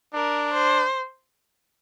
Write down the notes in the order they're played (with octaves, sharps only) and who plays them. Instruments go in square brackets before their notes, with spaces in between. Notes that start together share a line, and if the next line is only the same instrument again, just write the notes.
[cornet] D4 [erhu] A#4
[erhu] C5